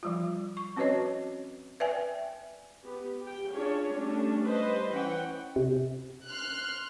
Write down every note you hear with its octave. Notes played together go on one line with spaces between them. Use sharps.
F3 G3 F4
C#6
C4 C#4 F#4 B4 C#5 D#5
B4 D5 E5 G5 G#5
B3 G4
G4 G5
C#4 D4 F4 G#4 C#5
G3 A3 C#4 D4
G3 B4 C5 D#5
E3 C#4 F#5 G5
C3
C6 F6 F#6